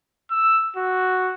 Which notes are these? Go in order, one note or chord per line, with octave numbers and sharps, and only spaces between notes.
E6
F#4